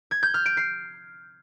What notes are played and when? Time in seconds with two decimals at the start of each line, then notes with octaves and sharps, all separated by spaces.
0.11 G#6
0.23 G6
0.34 F6
0.46 D7
0.57 C7